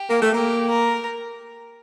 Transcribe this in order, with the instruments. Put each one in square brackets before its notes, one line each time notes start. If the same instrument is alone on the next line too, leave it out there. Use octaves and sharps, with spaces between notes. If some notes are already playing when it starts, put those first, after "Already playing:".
Already playing: [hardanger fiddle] G4
[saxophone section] A#3
A3
[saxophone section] A#3 [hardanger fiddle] G4
[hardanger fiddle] A#4